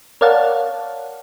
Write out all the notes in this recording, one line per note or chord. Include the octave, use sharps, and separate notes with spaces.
A#4 C#5 D5 F5 F#5 A5